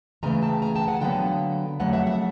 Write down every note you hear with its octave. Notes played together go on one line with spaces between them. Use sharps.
F2 C#3 E3 A3 G#5 A#5
G5 A5
G#5 A#5
G5 A5
F#5 G#5
D3 F#3 B3 F5 G5
F2 C#3 F#3 A3 F#5 G#5
E5 F#5
E5 F#5